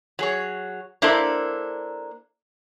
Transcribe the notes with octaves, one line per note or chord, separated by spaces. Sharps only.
F#3 G#4 C#5
A#3 D4 E4 A4 A#4 C5